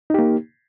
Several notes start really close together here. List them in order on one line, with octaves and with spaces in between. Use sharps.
D#4 G4 A#3